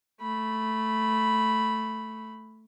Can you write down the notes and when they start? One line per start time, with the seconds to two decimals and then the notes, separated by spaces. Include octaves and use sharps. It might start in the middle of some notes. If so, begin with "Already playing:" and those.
0.21 A3 B5